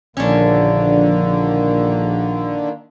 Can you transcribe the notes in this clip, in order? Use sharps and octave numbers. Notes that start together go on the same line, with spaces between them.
A#1 D3 D#3 A#3 C#4 D4